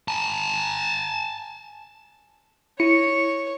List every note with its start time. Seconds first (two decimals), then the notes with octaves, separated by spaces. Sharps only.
0.08 G#5 A5
2.80 E4 C#5 A#6 C#7 D#7